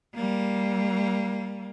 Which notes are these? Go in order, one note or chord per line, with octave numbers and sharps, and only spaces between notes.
G3 A#3